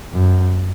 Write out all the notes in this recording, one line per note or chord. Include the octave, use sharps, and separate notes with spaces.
F#2